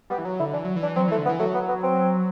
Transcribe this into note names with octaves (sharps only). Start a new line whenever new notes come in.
G3 B3
E3
F#3
D3 E4
E3 D4
F#3
E3
D4
F#3 C4
E3 A3
D3
B3
E3
F#3 A3
B3
B3
C4